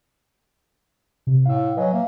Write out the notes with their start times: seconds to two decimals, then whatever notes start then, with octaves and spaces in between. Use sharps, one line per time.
1.27 C3
1.45 A2 F5 E6
1.77 F#3 B4 D#5 G#5
1.94 A#3 E5